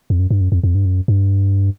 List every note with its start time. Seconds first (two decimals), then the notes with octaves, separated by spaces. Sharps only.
0.10 F2
0.19 F#2
0.31 G2
0.41 F#2
0.52 F2
0.64 F2
0.75 G2
0.85 F#2
1.08 G2